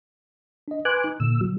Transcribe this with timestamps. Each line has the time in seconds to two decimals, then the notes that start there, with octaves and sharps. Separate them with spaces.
0.68 D4 D#5
0.85 B4 G#5 C6 D6 F#6 G6
1.04 D#4
1.20 A#2 D3 E6
1.41 F#3